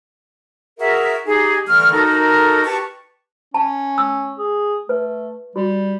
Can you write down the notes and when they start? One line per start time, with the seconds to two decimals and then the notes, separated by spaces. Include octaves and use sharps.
0.79 F#4 G#4 A#4 E5
1.26 D#4 G4 G#4
1.67 D3 E3 G3 A3 F6
1.93 D#4 F#4 A4 A#4
2.65 G4 B4 A5 C#6
3.54 C#4 A5
3.98 E6
4.39 G#4
4.89 A3 B4
5.56 G3 F#4